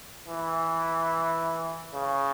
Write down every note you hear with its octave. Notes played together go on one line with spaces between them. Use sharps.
E3
C#3